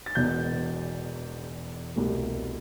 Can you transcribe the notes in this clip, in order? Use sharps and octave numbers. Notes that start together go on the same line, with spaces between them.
A6
E1 E2 B2 G6
C2 B2 A3